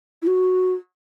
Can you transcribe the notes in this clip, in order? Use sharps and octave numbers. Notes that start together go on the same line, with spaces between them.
E4
F#4